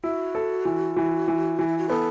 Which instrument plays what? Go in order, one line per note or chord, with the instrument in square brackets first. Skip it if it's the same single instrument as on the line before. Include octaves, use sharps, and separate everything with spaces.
[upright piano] E4 [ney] F#4
[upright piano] A4
E3
E3
E3
E3
[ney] E4
F#4
[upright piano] B3 [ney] A4